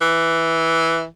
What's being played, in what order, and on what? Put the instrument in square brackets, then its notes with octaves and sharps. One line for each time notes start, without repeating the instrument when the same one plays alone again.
[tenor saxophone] E3